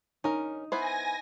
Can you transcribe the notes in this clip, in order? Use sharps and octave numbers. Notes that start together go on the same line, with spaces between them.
C#4 D#4 A#4
B3 E4 C5 G#5 A#6